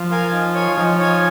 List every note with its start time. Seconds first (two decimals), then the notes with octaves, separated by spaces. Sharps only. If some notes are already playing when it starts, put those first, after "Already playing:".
Already playing: F3
0.11 A#4 F5 G#5
0.33 D#4
0.54 C#5 G#5
0.77 F3 D#4
0.99 C#5 G#5